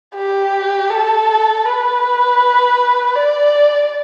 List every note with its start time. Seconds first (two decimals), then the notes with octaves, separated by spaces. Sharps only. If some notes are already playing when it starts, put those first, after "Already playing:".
0.15 G4
0.90 A4
1.65 B4
3.15 D5